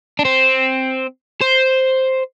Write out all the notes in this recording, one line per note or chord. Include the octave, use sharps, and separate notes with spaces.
D4
C4
C5